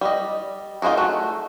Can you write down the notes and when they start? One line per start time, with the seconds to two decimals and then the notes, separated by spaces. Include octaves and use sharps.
0.01 G3 D#5
0.82 D#4 F4 F#4 G#4 A#4
0.97 A3 F#4